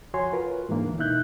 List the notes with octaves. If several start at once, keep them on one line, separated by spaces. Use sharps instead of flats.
F2 F#4 C#5 G#5 C6
F4 A#4 B4
G#2 E3 A#3 D4
D2
B2 D#4 E4 E5 F#6 G6